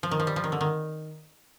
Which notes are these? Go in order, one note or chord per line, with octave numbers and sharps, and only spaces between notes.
F3
D#3
F3
G3
F3
D#3
D3
D#3